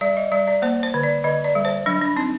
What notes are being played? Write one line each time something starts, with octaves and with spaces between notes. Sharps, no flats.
G3 D5
D#5
G3 D5
D5
A#3 C5
C5
D3
D5
D3 D#5
D5
G3
C5
F#3 D4
D4
C4 D#4